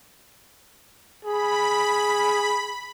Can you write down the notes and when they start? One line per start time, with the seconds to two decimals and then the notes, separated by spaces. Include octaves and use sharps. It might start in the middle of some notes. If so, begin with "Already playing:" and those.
1.25 G#4 B5